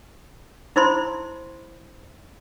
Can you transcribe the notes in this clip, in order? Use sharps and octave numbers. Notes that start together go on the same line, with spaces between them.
D#4 E4 C5 B5 C6